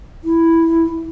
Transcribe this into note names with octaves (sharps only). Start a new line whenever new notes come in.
E4